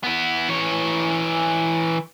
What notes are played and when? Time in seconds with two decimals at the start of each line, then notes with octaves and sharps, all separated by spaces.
0.04 B3 E4
0.49 E3 C#5